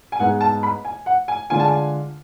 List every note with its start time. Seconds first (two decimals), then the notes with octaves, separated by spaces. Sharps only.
0.12 G#5
0.19 G#2 G#3 B3 F#5
0.41 A5
0.63 B5
0.85 G#5
1.06 F#5
1.28 G#5
1.50 D3 G#3 D4 F4 G#5
1.60 A5
1.68 G#5